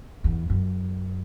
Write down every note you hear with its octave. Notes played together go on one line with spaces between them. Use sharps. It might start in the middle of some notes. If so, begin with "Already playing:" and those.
E2
F#2